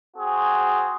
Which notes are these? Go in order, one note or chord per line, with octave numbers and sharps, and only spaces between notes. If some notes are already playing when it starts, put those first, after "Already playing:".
C4 F#4 G#4